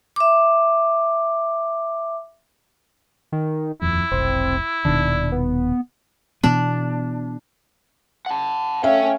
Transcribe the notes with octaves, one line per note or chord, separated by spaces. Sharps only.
E5 D6
D#3
D#1 F2 E4
F1 B1 C4
D#1 B2 D#3 D4
B3
B2 E3 B3 D4
F#5 A5
A3 C#4 E5 F5 G5